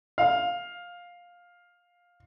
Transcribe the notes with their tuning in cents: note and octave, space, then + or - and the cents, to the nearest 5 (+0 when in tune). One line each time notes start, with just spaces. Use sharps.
F5 +15